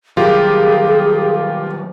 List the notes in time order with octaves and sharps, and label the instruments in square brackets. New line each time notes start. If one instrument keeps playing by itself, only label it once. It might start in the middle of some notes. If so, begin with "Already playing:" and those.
[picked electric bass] D#3 F#3 G3 [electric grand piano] F4 G4 A#4 [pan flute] G#4